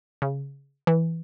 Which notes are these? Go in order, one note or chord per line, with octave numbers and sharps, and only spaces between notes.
C#3
E3